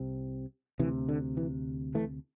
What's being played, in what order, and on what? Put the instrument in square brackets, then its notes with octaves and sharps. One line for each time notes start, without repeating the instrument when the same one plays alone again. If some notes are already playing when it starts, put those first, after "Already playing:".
Already playing: [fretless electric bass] C2 C3
D2 C3 E3
D3
E3
E3 A3